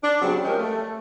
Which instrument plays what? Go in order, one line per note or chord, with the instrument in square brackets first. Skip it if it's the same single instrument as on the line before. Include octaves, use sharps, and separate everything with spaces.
[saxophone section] D4
C#3 F#3 G3 B3 C4
F3 G#3 C#4 G4 A#4
A3